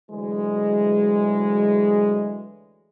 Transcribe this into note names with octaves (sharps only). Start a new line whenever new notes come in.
D2 E3 F#3 G#3